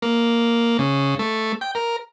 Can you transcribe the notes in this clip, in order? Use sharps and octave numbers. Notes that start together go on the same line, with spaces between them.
A#3
C#3
A3
G5
A#4